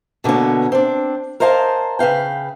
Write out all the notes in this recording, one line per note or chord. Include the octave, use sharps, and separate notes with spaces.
B2 D3 A#3 B3 C#4
C4 D4
A#4 C5 D#5 F5 G#5 A5
C#3 B4 F5 G5